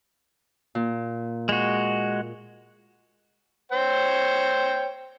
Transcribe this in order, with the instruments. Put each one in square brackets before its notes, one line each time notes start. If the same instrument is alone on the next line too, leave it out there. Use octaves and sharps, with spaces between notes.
[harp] A#2
[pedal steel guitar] G#3 F#4
[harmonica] C5 C#5 G5